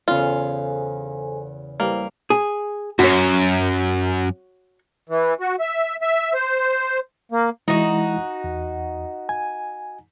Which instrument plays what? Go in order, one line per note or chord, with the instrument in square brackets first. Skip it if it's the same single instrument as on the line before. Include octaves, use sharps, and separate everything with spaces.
[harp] E2 C#3 [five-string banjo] F4 [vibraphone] A4 C5 G#5
[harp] G3 [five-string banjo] A#3 [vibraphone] E4 B4 C5
[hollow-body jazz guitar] G#4
[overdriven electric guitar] F#2 [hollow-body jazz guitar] F#4 C#5
[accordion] E3
F#4
E5
E5
C5
A#3
[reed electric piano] E3 G#3 E4 [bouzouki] D#4 F#4
[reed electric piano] E2
G#5